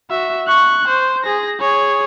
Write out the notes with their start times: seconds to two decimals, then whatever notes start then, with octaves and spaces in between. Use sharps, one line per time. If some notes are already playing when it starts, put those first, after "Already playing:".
0.10 F#4 E5
0.47 C#6 F#6
0.88 C5
1.24 G#4 A#6
1.60 G#4 C#5